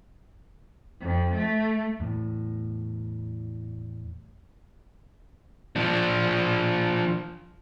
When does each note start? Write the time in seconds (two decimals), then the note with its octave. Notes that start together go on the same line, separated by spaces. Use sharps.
1.01 F2
1.35 A3
2.00 E2 A2
5.76 F3 D4